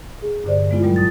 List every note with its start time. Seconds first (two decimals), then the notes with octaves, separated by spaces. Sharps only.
0.22 G#4
0.44 G2 A#2 D3 C5 D5
0.71 G#3 B3 E4 F4
0.83 A#2 F#3 G3 B3
0.96 F2 D#6 A6